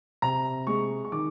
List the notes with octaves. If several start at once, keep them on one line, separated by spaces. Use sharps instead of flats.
C3 A#5
G#3 C#6
C#6
D#3 D6